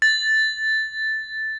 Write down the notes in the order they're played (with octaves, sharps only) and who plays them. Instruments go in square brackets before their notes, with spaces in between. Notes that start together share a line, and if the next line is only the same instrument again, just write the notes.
[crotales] A6